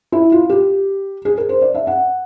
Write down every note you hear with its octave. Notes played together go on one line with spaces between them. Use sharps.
E4
F4
G4
G#4
A#4
C5
D5
E5
F#5